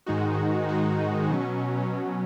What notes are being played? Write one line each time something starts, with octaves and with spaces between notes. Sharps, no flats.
G#2 D#3 G#3 D#4 F#4
G#2 D#3 G#3 D#4 F#4
B2 F#3 C#4
B2 F#3 C#4